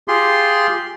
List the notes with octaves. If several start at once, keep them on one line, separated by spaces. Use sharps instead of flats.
F4 G4 G#4 C6